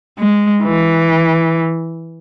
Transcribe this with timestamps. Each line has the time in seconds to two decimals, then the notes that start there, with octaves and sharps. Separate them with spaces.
0.19 G#3
0.63 E3